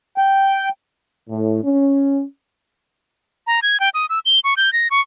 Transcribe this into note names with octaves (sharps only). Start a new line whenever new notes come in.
G5
A2
C#4
A#5
G#6
G5
D#6
E6
G7
C#6
G6
A#6
C#6